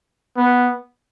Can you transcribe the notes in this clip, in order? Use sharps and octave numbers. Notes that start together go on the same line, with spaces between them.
B3